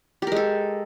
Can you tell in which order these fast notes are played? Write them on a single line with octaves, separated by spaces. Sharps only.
G4 A#4 G#3 A4